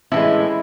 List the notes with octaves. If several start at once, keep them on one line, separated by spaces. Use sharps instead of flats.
A2 E3 G#3 C#4 E4